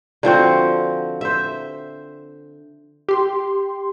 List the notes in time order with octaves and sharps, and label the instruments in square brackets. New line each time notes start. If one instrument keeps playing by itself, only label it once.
[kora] D3 F3 C4 F#4
C5 E5
[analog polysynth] G4 C6